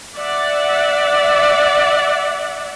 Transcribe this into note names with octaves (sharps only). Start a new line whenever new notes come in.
D5 E5 F#5